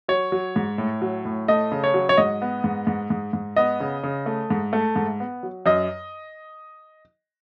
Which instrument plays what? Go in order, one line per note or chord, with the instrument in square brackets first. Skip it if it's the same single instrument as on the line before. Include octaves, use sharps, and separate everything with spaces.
[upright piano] F#3 C#5
F#3
G#2
A2
F#3
A2
A3 D#5
C#3
C#5
F#3
C#5
G#2 D#5
B3
G#2
G#2
G#2
G#2
B3 D#5
C#3
C#3
A3
G#2
A3
G#2
B3
F#3
F#2 D#5